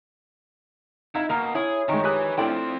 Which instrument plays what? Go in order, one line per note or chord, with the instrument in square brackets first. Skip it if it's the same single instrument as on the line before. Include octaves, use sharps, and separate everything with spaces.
[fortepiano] D#4 F5 A#5 [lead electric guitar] E4
[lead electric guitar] B2 [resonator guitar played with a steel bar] A#3 [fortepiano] F6
[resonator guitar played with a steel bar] E4 [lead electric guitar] G#4 [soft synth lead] C#5
[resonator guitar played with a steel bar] D#3 [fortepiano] G#3 D#4 [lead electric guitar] F#4 G5
[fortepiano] G4 D#6 F#6 [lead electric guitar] B4 G#5
[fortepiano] A3 D4 E4 [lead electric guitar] C4 F4 [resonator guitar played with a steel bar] D5 G5